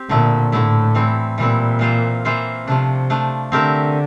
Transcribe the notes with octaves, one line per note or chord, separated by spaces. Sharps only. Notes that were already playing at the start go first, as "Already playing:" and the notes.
Already playing: C4 G4
A#2 D3 A3 E4
A2 D3 A3 E4
E3 G3 C4 E4
A#2 E3 G3 C4 E4
E3 A#3 F4 C5 E5
E3 A#3 F4 C5 E5
C3 F3 A3 D4
F3 A3 D4
D3 A3 C4 G4 A#4 E5